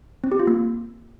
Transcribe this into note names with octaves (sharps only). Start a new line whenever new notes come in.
C4
G4
F4
A#3